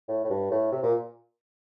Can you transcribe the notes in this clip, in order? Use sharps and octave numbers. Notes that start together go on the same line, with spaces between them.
A2
A2
G2
A2
C3
A#2